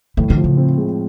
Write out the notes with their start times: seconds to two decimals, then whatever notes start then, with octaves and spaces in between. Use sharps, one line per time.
0.17 A2 E3
0.30 D#3
0.37 F3
0.44 C#3
0.57 C4
0.78 G#3